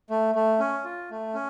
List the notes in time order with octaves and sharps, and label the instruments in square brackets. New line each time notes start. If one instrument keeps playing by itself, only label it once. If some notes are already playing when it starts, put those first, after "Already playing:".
[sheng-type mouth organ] A3
A3
C#4
F4
A3
C#4